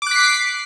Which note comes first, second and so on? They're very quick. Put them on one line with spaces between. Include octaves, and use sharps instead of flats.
D6 F#6 B6 C7